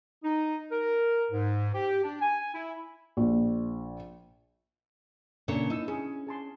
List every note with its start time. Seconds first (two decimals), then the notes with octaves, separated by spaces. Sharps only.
0.24 D#4
0.72 A#4
1.31 G#2
1.75 G4
2.04 D4
2.21 G#5
2.54 E4
3.17 A#1
5.48 A#2 C#3 D4 A4 C#5
5.70 D#4 E4 E6
5.88 C#4 G#4
6.27 G#4 A5 C6